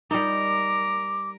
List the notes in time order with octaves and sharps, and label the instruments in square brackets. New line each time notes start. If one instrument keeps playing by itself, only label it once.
[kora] G3 D#4 [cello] A#4 [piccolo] D6